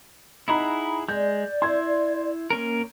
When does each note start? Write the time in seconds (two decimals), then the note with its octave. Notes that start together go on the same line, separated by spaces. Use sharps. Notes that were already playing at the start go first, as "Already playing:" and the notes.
0.48 D#4 E4 G#4 F#5 A#5 B5
1.09 G#3 D5 G6
1.62 E4 C6 G#6
2.50 A#3 C#4 A#4